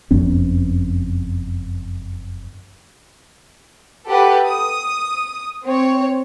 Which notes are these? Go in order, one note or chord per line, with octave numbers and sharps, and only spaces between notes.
F#1 F2 B3 C#4
G4 A4 B4 F#5
D#6
C4 C#5